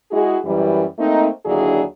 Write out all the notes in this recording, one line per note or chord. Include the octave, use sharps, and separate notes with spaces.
G#3 E4 F#4 G#4
F#2 E3 G3
A3 A#3 C4 D#4
D#2 D3 F#3 D4 E4 G#4